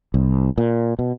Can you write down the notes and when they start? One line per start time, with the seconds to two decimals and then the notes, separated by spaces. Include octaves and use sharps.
0.14 C2
0.58 A#2
0.99 B2